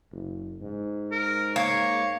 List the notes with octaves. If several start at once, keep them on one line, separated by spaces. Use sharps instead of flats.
F#1
G#2
A#4
A#3 C#5